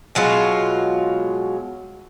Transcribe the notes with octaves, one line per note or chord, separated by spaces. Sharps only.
B2 F#3 G#3 F4